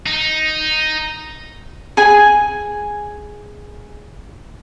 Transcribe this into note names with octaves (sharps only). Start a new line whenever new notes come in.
D#4
G#4 G#5